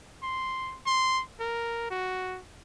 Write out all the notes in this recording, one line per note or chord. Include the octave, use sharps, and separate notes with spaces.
C6
C6
A#4
F#4